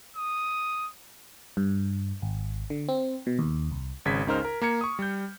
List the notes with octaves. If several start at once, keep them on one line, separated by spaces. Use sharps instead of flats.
D#6
G2
G#1
D3
C4
B2
D#2
C2
G#1 C#3 G#6 B6
C#2 C#3 D#4 A#4 C5 F6
A#4
A#3 A#5 G#6 C#7
C#6 D#6
G3 G6